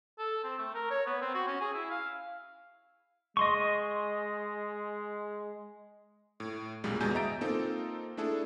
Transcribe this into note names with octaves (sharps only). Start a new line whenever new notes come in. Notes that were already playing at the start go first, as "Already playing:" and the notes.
A4
C4
A3
A#4
C#5
B3
C4
F#4
C#4
G#4
E4
F5
G#3 D#5 C6 C#6
A2
B1 F#2 A#2 G3 G#3
G1 E2 B2 G#3 G#5 G6
D#5 E5 A#5 G6 A6 D7
A#3 C4 D#4 F4 A4
A3 D4 E4 G#4 A4